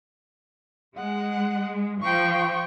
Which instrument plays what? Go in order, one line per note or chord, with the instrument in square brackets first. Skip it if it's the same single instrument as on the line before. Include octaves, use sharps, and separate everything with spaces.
[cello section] G#3 [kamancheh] F#5
[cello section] F3 [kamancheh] G5 C#6